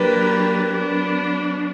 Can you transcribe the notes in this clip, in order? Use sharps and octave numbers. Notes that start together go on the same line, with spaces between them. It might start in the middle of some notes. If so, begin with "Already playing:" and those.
Already playing: F#3 A#3 D4 G4 A#4 B4
F#3 B3 D4